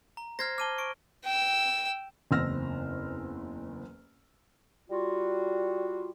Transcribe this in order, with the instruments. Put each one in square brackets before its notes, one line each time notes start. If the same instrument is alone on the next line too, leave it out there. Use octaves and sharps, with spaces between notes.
[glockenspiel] A#5
[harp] C5 [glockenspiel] F6 G#6 A#6
[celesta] A5 D6 [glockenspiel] F6 D#7 G7
[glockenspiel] C#6 D7
[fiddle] G5 E6
[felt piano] F#1 E2 C4 E6 F6 A#6
[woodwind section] G3 F4 F#4